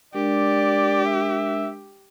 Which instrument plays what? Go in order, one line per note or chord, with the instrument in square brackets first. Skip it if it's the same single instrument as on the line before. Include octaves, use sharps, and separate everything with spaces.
[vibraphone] G#3 D4 A#4 [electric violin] G4 [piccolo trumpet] D5
[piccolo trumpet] E5